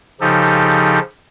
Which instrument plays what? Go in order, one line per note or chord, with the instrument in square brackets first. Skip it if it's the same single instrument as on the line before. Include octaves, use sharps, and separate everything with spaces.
[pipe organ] C#3 F3 D#4 G4 A4